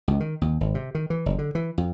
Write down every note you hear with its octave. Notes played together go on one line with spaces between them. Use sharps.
C#2
D#3
D#2
G#1
C3
D#3
E3
F#1
D3
E3
F2